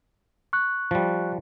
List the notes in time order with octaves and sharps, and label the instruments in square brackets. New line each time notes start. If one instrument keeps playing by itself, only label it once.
[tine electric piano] C#6 F#6
[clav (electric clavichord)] F3 G3